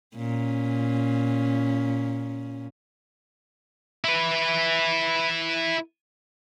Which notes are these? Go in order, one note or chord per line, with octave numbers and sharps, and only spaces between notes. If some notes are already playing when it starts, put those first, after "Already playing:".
A#2 C#4
E4 B4